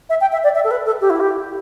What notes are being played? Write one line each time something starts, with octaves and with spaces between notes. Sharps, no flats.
E5
G5
E5
D5
E5
A4
B4
A4
G4
E4
G4